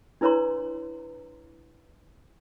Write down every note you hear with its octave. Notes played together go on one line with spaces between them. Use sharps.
D4 E4 B4 C#5 A#5 C6